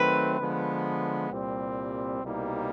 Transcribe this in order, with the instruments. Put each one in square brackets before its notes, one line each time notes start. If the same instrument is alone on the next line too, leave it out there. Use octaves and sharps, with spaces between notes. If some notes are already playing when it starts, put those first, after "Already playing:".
Already playing: [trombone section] D#3 F#3 A3 C4 [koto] B4
[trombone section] D3 F3 G#3 B3
C2 A#2 G3 C4
C2 B2 G3 A#3 D#4